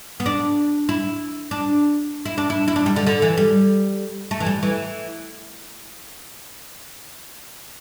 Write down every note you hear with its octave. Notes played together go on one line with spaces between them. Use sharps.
B3
D4
E4
D4
E4
D4
E4
E4
D4
G3
D3
D3
E3
G3
A3
E3
G3
E3